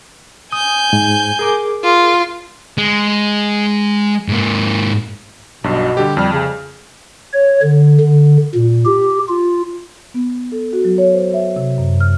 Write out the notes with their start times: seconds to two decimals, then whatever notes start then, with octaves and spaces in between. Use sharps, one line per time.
0.52 G#5 D#6 G6
0.93 G#2
1.39 G#4 A#4 D6
1.84 F4
2.78 G#3
4.28 G#2 A#3
5.64 B1 G2 B2
5.97 D3 G3 G4
6.17 F2 G3 F6
6.33 C#3
7.33 C#5
7.63 D3
8.00 D3
8.55 A#2
8.86 G4
9.29 F4
10.14 B3
10.52 A4
10.73 F#4
10.85 F#3
10.98 C#5
11.13 C5
11.34 E5
11.56 C3
11.78 F#2
12.00 F6